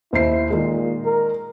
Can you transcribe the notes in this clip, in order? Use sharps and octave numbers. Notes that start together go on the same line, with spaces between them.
D#2 E4 C5 C7
A#2 D#3 G#3
A#4